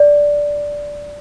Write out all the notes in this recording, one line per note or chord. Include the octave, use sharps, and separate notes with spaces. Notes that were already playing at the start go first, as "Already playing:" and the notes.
Already playing: D5